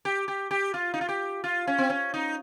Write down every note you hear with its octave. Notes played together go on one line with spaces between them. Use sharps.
G4
G4
G4
F4
D#4
F4
G4
F4
C#4
C4
C#4
D#4